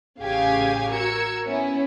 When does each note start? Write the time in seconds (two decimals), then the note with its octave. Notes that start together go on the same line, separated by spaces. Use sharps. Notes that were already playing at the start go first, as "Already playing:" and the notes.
0.21 A1 C#3 G4 F5 G#5 G#6
0.91 F#4 A#4 E6 G#6 C#7
1.45 B3 C#4 E4